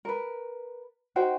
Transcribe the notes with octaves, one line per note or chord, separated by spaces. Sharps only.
A#4 B4
D#4 F#4 C5 G5